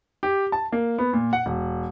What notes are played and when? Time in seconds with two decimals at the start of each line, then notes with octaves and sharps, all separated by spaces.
0.23 G4
0.52 A5
0.72 A#3
0.98 B3
1.13 A#2
1.33 F#5
1.46 E1